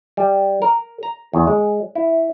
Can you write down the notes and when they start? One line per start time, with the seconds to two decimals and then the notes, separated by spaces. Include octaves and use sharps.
0.17 G3
0.62 A#4
1.03 A#5
1.33 E2
1.47 G#3
1.95 E4